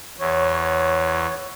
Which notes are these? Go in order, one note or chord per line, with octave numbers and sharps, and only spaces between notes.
E2 C#5